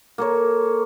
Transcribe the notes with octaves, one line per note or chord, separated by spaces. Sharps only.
A#3 A4 C#5